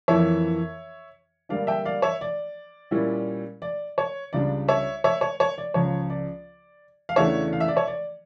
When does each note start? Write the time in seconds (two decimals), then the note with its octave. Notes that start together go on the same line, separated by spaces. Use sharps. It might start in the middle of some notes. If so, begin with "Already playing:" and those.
0.08 F2 E3 A#3 E4 C#5 E5
1.49 G2 D3 G3 A#3 D4 D5 F5
1.67 E5 G5
1.85 D5 F5
2.02 C#5 E5
2.21 D5
2.91 A#2 G3 C#4 E4
3.62 D5
3.98 C#5
4.33 C#2 C#3 G3 D4 D5
4.68 C#5 E5
5.04 C#5 E5
5.21 C#5
5.40 C#5
5.58 D5
5.74 C#2 C#3 F3 C#5
6.10 D5
7.09 F5
7.16 E2 C#3 E3 A3 D4 C#5 E5
7.53 F5
7.60 E5
7.68 D5
7.76 C#5 E5
7.87 D5